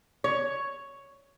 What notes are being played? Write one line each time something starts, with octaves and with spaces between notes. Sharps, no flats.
C#5